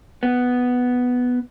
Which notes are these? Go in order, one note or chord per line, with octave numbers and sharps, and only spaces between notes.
B3